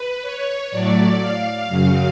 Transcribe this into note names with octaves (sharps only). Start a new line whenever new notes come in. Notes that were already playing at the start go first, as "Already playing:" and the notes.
Already playing: B4
C#5
A2 F#3 A3 D5
F5
F#2 C#3 F#3